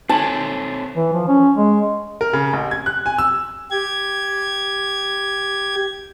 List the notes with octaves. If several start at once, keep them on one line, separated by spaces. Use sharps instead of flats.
C4 D#4 A4 C#5 G#5 A5 F#7
E3
F3
C#4
G#3
A#4
C#3
A1
G#6
F#6
G#5
E6
G4 G#6